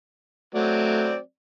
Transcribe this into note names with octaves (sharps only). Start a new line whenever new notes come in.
F#3 A3 C4 D5